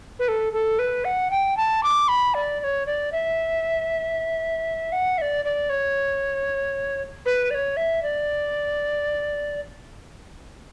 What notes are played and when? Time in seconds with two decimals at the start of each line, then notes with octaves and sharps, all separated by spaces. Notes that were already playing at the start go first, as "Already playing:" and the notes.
0.19 B4
0.28 A4
0.53 A4
0.79 B4
1.05 F#5
1.31 G5
1.57 A5
1.83 D6
2.08 B5
2.34 D5
2.60 D5
2.64 C#5
2.86 D5
3.12 E5
4.92 F#5
5.18 E5
5.21 D5
5.45 D5
5.69 C#5
7.26 B4
7.50 D5
7.54 C#5
7.77 E5
8.03 D5